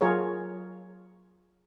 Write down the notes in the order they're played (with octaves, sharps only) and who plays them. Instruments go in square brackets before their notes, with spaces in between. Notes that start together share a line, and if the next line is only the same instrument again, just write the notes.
[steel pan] F#3 F4 G#4 A#4 C#5